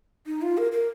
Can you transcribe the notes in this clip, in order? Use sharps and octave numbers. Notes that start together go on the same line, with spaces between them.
D#4
F4
A#4
A#4